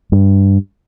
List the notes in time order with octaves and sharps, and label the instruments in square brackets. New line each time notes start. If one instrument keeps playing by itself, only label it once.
[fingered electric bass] G2